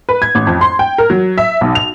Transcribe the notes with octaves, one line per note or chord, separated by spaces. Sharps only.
B4
G#6
A1
F2
C6
G5
A#4
F#3
E5
B1
F7